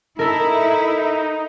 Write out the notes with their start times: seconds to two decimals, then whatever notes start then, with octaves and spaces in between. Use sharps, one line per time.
0.19 D#4 E4 A4 A#4